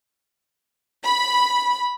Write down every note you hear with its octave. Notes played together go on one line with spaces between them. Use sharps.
B5